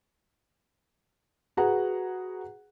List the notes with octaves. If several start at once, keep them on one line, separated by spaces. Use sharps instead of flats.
F#4 G#4 B4 F#5 A#5